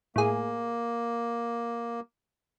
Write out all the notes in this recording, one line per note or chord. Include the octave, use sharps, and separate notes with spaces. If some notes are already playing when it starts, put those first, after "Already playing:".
A2 A#3 G#4